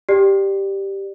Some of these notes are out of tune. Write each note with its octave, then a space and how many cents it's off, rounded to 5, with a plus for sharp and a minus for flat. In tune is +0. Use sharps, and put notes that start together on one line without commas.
G4 +0 D5 +15